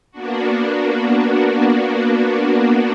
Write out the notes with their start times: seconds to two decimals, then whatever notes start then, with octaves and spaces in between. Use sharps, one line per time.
0.12 A#3 B3 D4 F#4